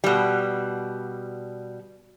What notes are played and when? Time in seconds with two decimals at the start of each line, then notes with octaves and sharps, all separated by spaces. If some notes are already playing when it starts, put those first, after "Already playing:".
0.04 B2 G3